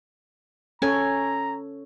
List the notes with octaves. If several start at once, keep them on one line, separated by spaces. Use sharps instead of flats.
C#4 A4 C#5 G#5 A#5